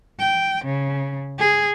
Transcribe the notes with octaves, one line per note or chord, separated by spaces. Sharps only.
G5
C#3
G#4